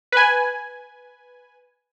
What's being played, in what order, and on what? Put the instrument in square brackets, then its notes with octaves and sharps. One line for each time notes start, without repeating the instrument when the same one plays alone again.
[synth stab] B4 G#5